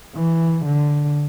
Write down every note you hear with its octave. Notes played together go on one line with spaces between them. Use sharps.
E3
D3